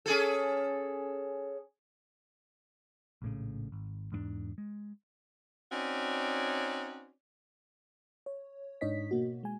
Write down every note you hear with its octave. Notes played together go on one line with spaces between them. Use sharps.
C#4 G#4 A4
A#1 A2 C#3
G#1
E2 G#2 A#3 D4
G#3
C4 C#4 D#4 F#4 C#5 D5
C#5
G#2 D4 D#4 C#5 D#5 B6
B2 A#3 F#4
G#3 G#5